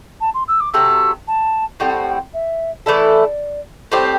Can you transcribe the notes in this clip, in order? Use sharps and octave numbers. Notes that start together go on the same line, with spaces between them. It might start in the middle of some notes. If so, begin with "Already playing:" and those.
A5
C6
E6
D6
C3 F#3 A3 E6
A5
A2 G3 C4 F#5
E5
E3 A3 E4 A4 D5
A2 G3 C4 G4 C5